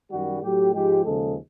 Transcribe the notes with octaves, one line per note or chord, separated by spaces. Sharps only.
F#2 D#3 G3 F#4
A2 F#3 G4
G#2 F3 G#3 G4
D#2 C#3 F3 G#3 A4